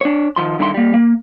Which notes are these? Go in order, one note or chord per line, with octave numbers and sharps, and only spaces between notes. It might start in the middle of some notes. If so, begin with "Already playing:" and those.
D4 C#5
D#3 F3 C6
G2 D3 D#3 E4 A#5 C6
G3 A#3
A#3